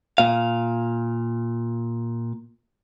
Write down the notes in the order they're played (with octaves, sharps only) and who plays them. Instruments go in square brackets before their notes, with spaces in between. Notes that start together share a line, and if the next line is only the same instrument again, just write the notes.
[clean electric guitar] A#2 F5